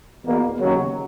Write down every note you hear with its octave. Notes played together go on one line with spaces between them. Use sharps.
E2 B2 A#3
D#2 C#3 F#3